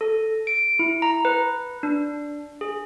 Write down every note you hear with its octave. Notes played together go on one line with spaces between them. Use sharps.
A4
D7
E4
A#5
B4
D4
G#4